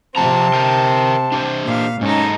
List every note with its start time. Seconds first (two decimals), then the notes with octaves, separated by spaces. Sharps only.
0.16 C3 F3 C4 F4 A5 A#5
0.54 A#4 G5
1.32 D4 G4 C5
1.65 A#2 F5
2.01 G#2 G#3 C#4 D#4 A4